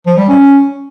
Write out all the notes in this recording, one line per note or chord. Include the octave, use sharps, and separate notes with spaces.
F3
G3
C#4